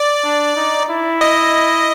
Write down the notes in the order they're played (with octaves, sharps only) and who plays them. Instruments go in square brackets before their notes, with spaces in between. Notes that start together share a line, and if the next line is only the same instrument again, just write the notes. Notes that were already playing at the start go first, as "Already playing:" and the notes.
Already playing: [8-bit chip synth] D5
[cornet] D4
D#4
E4
[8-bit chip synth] D#5